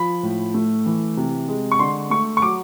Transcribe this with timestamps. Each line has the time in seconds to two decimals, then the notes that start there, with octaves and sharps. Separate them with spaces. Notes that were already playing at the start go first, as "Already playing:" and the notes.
Already playing: F3 B5
0.23 A2
0.54 A3
0.86 E3
1.17 C3
1.48 G#3
1.72 C#6
1.79 D3 C6
2.10 A3 C#6
2.37 C#6
2.42 F#3 D6